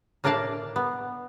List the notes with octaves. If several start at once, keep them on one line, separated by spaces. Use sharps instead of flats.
A2 A#3 D4 D5 F5 A5
B3